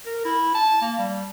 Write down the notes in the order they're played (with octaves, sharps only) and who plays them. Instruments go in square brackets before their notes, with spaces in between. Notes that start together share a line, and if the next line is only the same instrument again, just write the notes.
[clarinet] A#4
E4
A5
A#3
G3